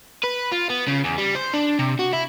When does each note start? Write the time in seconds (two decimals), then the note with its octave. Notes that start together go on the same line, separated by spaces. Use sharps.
0.24 B4
0.52 F4
0.70 B3
0.88 C#3
1.04 E2
1.18 G3
1.35 C5
1.53 D4
1.79 C3
1.99 F#4
2.13 E4